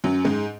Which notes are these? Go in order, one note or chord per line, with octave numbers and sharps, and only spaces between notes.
F#2 F#3
G#2 G#3